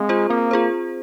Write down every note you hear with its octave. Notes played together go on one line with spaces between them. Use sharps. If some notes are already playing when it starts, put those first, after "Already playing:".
Already playing: G#3 C4
F4 G#4 C5
A#3 C4
F4 G#4 C5